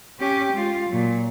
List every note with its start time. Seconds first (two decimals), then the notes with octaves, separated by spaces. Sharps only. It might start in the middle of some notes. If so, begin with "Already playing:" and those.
0.19 C#4 G4
0.53 G#3 F4
0.89 A#2 F#3